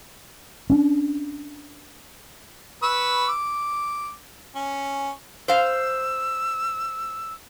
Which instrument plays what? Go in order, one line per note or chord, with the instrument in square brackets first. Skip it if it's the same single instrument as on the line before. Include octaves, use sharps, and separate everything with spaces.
[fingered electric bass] C#4 D4
[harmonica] B4 C#6 E6
D6
C#4
[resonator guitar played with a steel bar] C5 F5 [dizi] E6